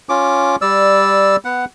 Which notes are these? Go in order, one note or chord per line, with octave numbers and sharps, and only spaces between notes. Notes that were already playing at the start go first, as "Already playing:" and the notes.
C#4 F4 D6
G3 D5 E6
B3 F#5